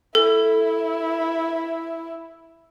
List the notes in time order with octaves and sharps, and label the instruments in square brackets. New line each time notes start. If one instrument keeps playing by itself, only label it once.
[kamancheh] E4 [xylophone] A4